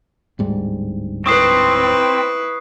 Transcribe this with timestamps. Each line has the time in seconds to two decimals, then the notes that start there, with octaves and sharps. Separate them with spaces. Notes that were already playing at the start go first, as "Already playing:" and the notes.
0.39 D1 G#2 G3
1.26 C4 E4 B4 C#6 D#6 C7